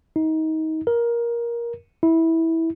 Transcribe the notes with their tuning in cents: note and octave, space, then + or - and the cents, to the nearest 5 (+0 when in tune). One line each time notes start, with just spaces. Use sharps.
D#4 +25
A#4 +15
E4 -15